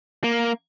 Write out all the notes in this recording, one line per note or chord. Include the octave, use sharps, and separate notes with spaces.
A#3